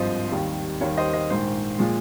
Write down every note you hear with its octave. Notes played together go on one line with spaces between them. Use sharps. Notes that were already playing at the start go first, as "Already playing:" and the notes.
Already playing: G#1 G2 F3 C5 D#5
D#2 D#3 G3
D#2 D#3 G3 C#5
C5 D#5
C5 D#5
A#1 G#2 D#3 C5
A#2 F3 G#3